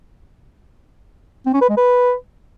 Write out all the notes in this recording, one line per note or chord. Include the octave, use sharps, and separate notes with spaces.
C4
C#4
B4
G#3
B4